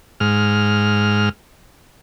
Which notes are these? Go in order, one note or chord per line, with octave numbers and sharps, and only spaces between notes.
G#2 F6